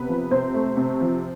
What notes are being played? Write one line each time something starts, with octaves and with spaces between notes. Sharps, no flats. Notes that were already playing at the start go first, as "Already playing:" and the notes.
Already playing: C3 B3 B4
F3
C3 C4 C5
A3
C3
F3